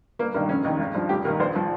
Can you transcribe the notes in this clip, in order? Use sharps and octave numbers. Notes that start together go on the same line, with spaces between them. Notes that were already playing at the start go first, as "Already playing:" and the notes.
G1 A#3
G2 D#3 A#3
F1 C#4
D#2 D#3 D#4
G#1
G2 F3
F1 G4
D#2 D#3 A#4
A#1 C5
F3